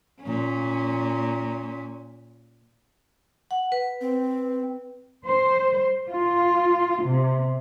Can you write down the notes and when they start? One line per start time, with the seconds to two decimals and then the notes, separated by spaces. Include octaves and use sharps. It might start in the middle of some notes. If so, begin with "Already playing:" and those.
0.22 A#2 C#4
3.51 F#5
3.72 B4
4.01 C4
5.25 C5
6.08 F4
7.03 C3